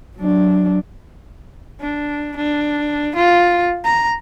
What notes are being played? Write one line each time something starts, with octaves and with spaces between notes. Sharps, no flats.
F#3 D4
D4
D4
F4
A#5